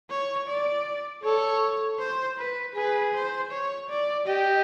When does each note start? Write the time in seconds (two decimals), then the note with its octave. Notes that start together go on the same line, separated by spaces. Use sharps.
0.10 C#5
0.48 D5
1.23 A4 C#5
1.99 C5
2.38 B4
2.75 G#4 B4
3.14 C5
3.52 C#5
3.89 D5
4.27 G4 D#5